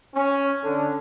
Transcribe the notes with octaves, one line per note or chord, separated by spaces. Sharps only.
C#4
D3